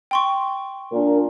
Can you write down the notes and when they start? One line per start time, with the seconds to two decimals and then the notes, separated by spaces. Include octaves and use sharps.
0.11 G5 C6 C#6
0.92 A#2 D4 A#4